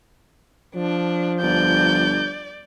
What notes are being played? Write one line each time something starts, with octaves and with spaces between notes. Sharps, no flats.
F3 D4
G1 D5 G6